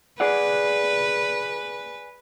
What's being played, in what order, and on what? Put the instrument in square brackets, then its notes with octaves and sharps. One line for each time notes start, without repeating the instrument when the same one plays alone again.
[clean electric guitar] G#4 D5 F#5 [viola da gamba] B4